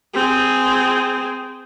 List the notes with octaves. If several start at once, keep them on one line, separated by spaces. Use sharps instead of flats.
C4 G#4